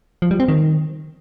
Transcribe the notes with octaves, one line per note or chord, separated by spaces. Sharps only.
F3
G3
C4
D#3